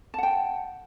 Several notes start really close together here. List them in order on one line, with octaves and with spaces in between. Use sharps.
A5 F#5 G5